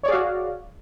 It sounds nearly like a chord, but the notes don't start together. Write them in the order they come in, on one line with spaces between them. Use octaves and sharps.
C#5 D5 G#4 F5 F#4